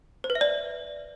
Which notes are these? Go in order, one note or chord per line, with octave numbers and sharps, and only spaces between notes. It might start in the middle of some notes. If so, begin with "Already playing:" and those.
C5
B4
E5
D5